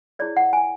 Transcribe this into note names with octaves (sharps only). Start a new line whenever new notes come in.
E4 G#4 C#5 D5
F#5
G#5